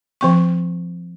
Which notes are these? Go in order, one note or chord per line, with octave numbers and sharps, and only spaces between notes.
F3 C4 C#6